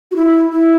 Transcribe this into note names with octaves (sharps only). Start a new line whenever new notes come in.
F#4
E4
E4